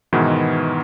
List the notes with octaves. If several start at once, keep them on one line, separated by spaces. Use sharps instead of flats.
G#2 B2 D#3 E3 B3 E4